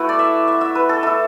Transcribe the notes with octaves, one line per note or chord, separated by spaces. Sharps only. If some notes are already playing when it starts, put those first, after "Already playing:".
Already playing: A3 E4 F#4 A4 B4
D5
E5
E5
E5
B4
A4
A3 E4 A4